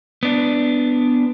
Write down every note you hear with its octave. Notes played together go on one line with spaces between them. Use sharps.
B3 D4